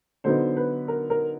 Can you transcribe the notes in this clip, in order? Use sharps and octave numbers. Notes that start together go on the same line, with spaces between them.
D3 F#3 B3 D#4 C5
B4
A#4
A#4